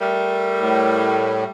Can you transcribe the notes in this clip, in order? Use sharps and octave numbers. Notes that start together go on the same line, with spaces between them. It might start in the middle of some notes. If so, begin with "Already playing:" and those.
G3 A3 A#4
A2